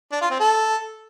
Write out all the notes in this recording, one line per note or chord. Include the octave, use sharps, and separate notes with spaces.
D4
F4
C4
A4